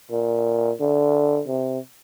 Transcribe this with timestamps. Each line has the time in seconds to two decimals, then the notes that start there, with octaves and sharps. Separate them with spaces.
0.11 A#2
0.81 D3
1.48 C3